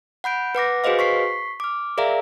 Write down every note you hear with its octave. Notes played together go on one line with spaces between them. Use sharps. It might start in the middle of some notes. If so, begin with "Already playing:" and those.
F#5 B5 G6 D7
B4 F#5 D6 A#6
F#4 G#4 B4 C5 D#5 F5
C#6 B6 C7
D6 F6
G#4 A#4 D5 E5 F5 A#5